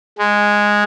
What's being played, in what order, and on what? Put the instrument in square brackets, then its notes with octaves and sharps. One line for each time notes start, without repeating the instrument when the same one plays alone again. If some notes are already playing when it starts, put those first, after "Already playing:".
[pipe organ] G#3